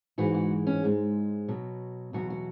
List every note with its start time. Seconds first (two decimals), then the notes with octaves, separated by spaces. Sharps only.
0.18 G#2 E3 G#3 F#4
0.34 F#4
0.67 C#4
0.83 G#2 G#3
1.48 B2 F#3
2.13 E2 B2 F#3 F#4
2.30 F#4